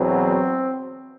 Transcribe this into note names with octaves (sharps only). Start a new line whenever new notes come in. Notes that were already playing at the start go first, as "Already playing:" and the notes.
Already playing: E2 B2 F#3 C4